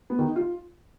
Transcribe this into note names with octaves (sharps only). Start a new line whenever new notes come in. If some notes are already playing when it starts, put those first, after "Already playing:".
B3
D#3
D#4
F4